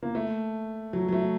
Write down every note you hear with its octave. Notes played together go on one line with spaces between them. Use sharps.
A#3
A3
F#3
F#3
A3